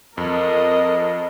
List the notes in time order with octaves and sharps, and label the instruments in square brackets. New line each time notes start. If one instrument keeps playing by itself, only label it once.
[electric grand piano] F2 [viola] A#4 D#5